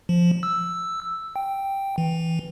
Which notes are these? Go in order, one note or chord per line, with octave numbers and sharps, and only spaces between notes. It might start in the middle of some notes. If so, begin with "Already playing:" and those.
F3
E6
G5
E3